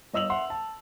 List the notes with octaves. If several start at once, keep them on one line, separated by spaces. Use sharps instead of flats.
G1 D#5 E6 F7 F#7
E5 F#5 C6
A5